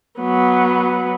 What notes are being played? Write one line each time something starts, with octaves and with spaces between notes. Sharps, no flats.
F#3 B3